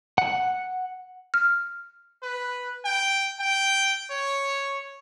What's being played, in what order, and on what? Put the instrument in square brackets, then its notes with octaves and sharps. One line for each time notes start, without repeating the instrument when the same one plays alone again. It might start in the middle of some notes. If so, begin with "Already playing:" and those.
[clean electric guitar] F#5
[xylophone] F6
[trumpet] B4
G5
G5
C#5